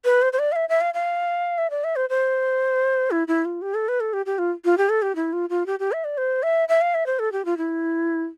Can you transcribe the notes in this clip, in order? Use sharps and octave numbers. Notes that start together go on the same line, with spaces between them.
B4
C5
C5
D5
F5
E5
E5
F5
F5
E5
D5
E5
C5
C5
E4
E4
F4
G4
A4
B4
A4
G4
G4
F4
F4
G4
A4
G4
E4
F4
F4
G4
G4
E5
D5
C5
E5
E5
F5
E5
C5
A4
G4
F4
E4